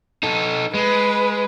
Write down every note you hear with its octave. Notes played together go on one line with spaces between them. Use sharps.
D#4 A4
G#3 B4